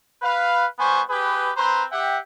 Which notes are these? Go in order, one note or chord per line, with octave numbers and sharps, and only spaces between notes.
B4 F5
G3 B3 C5 G#5 C#6
G4 G#4 B4
C4 B4 C5 A#5 C6
G4 E5 F#5 G5